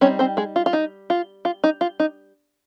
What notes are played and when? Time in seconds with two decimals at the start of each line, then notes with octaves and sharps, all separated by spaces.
0.01 G3 C4 C#4 D#4 C#5
0.19 C4 C5
0.37 G#3 G#4
0.56 F4
0.66 F4
0.73 D#4
1.10 F4
1.45 F4
1.64 D#4
1.81 F4
2.00 D#4